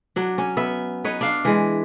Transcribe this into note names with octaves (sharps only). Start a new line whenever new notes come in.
F#3 D4
C#4
B3 E5
D#4 B4 C#5
D4 F5
E3 G#3